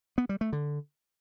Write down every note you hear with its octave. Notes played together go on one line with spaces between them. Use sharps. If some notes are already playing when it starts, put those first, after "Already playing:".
B3
G3
A3
D3